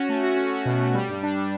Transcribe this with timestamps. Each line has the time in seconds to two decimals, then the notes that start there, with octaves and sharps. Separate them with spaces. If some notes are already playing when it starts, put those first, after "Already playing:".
Already playing: C#4 F#4
0.09 A3
0.23 F#4
0.36 C#4
0.52 C#4
0.65 B2
0.80 A3
0.94 G3
1.08 G2
1.23 D4
1.37 D4